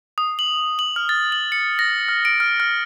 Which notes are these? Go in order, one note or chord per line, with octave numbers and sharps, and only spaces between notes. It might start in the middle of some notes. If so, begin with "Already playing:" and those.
D#6
F#7
F#7
F6
A6
F#7
C#7
A#6
F6
D7
F6
F6